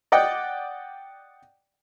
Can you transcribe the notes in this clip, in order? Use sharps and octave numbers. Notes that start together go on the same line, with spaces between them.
D5 D#5 F#5 G5